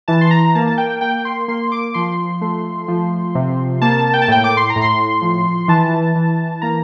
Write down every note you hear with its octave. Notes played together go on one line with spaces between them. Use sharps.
E3 A5
C6
A#5
A#5
A#3 A5
A5
G5
A#3 G5
C6
A#3 C6
D6
F3 C6
A3
F3
C3
A#3 A5
G5
A5
A2 G5
D6
C6
A#5
A2
C6
F3
E3 A5
E3
A#3 A#5